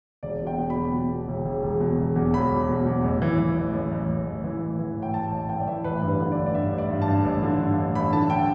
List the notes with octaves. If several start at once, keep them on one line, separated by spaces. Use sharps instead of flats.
E1 D5
B2
G5
B2
B5
E2
B2
B2
E1
E1
E1
B2
E1
E2
E1 B5
E1
B2
E2
A1
E3
E3
A1
A1
A1
A1
A1
E3
A1
E3
A2
G5
A2 A5
A1 A5
A2 G5
D5
E3 E5
A1 B4
G2
B4
D3
D5
A1
D5
G2 E5
A1
D5
G2
A5
G2
A1
D3
G2
A1
A1 B5
D3 A5
G5